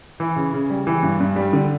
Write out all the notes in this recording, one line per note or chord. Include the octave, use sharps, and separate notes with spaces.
E3
C#3
C#3
G3
E3
G2
G2
G3
D3